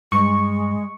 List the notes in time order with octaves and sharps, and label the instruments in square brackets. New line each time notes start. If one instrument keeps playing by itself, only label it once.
[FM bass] G2 [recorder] G#3 [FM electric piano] C#6